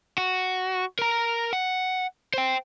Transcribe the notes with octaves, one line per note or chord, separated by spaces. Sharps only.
F#4
A#4 A#5
F#5
C5 G5